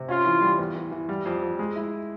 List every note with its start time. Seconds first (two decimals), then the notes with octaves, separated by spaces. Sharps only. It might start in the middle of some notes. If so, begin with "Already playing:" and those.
Already playing: C3
0.08 C#4 F4
0.26 E3
0.41 G3
0.59 E2
0.75 E3
0.91 E3
1.09 G3
1.26 F2
1.42 F2
1.59 G#3
1.76 E4